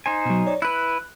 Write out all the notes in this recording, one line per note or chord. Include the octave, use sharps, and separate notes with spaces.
D#4 C5 G#5
B2 F#3
C#5 D5
E4 B4 F#6